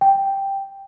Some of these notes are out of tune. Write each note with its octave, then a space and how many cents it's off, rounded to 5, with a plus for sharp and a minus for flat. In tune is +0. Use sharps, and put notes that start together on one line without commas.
G5 +0